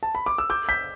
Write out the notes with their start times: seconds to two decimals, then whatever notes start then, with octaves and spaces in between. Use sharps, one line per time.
0.03 A5
0.15 B5
0.26 D6
0.38 E6
0.50 D6 G6
0.69 G6 B6